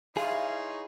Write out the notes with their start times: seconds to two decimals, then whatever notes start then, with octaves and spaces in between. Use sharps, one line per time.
0.17 D#4 E4 G#4 C#5 F5 C6